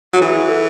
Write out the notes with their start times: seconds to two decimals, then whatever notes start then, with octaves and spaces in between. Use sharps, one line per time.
0.14 F#3
0.21 E3 G#4
0.49 A4